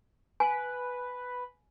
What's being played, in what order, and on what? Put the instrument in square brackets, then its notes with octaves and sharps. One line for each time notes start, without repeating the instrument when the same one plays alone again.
[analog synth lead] B4 [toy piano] G#5